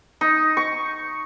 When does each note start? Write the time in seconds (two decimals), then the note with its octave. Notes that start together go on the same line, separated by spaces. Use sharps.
0.21 D#4
0.57 C#6